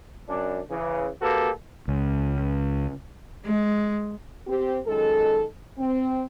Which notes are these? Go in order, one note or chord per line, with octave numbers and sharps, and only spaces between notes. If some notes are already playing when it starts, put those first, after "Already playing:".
F#2 D4
C#3 E3
A#3 F#4 G4 A4 B4
C#2
G#3
C4 G4
F#2 D#3 G#3 A4
C4